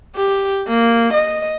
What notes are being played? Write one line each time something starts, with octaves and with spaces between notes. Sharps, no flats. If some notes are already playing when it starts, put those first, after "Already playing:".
G4
A#3
D#5